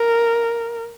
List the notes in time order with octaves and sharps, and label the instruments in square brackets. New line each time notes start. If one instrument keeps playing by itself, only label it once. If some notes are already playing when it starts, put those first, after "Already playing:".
Already playing: [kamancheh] A#4